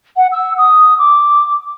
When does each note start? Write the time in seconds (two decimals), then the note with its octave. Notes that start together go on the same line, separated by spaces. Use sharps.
0.16 F#5
0.32 E6
0.57 D#6
0.98 D6